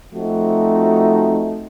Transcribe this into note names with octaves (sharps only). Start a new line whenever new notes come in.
F3 A3 C4 D#4 F#4